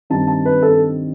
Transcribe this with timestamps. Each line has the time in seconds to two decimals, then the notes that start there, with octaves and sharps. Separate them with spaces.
0.10 G2 D#3 G3 C4 A5
0.28 A5
0.45 B4
0.62 A4